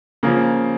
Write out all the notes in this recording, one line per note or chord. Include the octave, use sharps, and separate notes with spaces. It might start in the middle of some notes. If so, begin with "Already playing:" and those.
C#3 F3 A#3